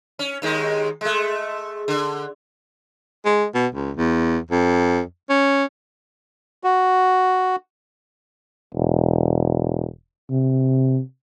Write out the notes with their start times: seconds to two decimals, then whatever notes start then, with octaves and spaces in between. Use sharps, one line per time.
0.19 C#4
0.42 D#2 D#3 G#3
1.01 G#3 A3
1.88 D3
3.25 G#3
3.55 B2
3.75 C#2
3.97 E2
4.51 F2
5.30 C#4
6.64 F#4
8.75 E1
10.30 C3